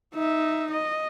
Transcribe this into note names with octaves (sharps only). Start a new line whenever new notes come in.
D#4 E5
D#5